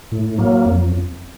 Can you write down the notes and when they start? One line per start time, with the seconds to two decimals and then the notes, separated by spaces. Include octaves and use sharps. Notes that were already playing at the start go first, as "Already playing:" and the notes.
0.12 A2
0.38 F#3 A#3
0.66 F2